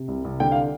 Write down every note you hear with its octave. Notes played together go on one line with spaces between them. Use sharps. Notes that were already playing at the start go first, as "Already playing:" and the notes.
Already playing: C3
C2
C2
D3 G5
F5